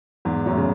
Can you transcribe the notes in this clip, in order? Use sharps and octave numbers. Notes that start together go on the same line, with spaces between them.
E2 G#2
F#2 A2
C#3